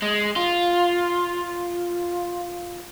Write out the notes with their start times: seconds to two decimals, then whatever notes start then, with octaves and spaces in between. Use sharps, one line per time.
0.02 G#3
0.36 F4